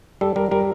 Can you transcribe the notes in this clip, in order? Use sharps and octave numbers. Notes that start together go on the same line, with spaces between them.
G3 A4
G3 A#4
G3 A#4